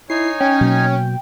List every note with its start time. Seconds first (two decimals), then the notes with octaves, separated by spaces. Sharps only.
0.10 D#4 E4 C#5 G#5 C7
0.40 C#4 G5
0.61 B2 F#3 A#3